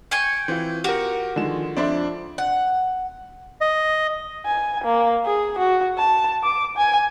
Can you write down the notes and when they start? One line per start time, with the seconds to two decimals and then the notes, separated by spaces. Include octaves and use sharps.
0.11 G5 G#5 C#6
0.48 E3 C4 F4
0.84 F#4 G4 A#4
1.36 D3 D#3 F3 G#3 E7
1.77 F2 D4 C5 D5 E5 C6
2.38 F#5
3.61 D#5
4.46 G#5
4.84 A#3
5.26 G#4
5.58 F#4
5.98 A5
6.43 D6
6.77 G#5